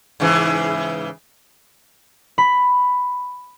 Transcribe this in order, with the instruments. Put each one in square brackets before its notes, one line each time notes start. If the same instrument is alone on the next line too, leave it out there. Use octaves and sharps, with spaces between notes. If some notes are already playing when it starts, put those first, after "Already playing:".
[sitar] G#2 C#3 E3
[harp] B5